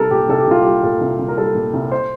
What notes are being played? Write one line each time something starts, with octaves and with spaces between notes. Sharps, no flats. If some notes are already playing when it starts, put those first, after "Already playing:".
Already playing: C2 G3 A4 A#4
A#2 G4
C2 A4
G4
C2 F4
G3 G4
A#2 A4
C2
C2
A#4
G3 A4
A#2
C2
C5